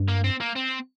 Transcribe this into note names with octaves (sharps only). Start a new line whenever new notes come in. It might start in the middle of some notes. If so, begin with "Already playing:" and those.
Already playing: G2
A#3
C4
A#3
C4